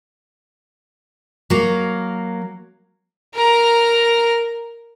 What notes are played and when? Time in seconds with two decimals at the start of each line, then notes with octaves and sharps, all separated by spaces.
1.50 F#3 A#3
3.35 A#4 A#5